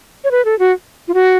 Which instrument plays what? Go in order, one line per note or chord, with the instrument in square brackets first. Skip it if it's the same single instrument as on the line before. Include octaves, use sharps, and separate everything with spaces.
[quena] C#5
B4
A4
F#4
F4
F#4